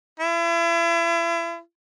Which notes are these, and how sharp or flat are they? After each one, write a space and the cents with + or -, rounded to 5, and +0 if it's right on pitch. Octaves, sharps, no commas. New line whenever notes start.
E4 +40